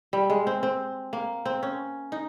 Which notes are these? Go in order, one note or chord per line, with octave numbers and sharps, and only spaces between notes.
G3
G#3
C4
C4
A#3
C4
C#4
D#4